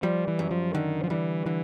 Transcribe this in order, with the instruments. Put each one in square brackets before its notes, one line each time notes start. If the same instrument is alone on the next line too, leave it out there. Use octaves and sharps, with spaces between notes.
[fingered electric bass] F3 [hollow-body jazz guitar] G3
[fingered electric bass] E3
[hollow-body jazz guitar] F#2
[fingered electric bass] F3
[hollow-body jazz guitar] D3 [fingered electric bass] D#3
[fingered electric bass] F3
[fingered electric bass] E3 [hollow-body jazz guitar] G3
[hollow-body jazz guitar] D3 [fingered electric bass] E3